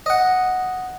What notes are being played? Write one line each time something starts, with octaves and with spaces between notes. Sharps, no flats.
D#5 F#5